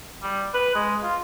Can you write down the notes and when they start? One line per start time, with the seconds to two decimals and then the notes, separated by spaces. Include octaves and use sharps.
0.23 G3
0.54 B4
0.75 G#3
1.03 F4